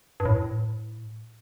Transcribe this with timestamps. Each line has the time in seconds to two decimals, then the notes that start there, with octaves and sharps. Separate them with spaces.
0.20 G2
0.25 A2